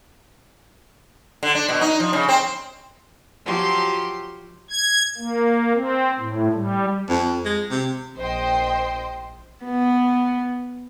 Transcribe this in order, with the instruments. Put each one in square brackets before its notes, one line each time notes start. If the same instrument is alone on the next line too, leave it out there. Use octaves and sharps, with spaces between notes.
[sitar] D3
D4
B2
D#4
F3
C#3
C4
[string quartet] F3 F#3 G4 C6
[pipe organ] G#6
A#3
C4
A2
G3
[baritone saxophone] F2
G#3
C3
[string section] A#1 C5 D#5 G5 C6
[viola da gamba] B3